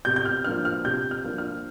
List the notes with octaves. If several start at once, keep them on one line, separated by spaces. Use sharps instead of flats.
C3 G6
G6
F6
F3 A#3 D4 F6
F6
C3 G6
F6
F3 A#3 D4
F6